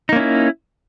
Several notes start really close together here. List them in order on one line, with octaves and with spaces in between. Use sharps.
D#4 A#3 C#4 E4